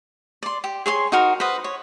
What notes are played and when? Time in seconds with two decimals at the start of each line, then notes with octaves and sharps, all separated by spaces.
0.43 D5 C6
0.64 G4
0.86 G#4 C#5 C6
1.12 D#4 F#4 A#4
1.40 B4 C5 D#5
1.64 C#5